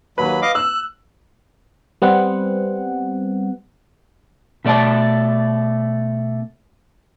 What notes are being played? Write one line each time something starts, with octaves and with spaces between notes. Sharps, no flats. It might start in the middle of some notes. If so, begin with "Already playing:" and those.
D#2 F#3 B4 B5
D#5 F5 D6
E6 F#6
G3 B3 C4 F#5
B2 A3 D5 G5 A5